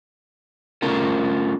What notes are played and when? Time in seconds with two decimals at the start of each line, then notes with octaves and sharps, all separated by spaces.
0.82 A3 C#4 F4 A4 A#4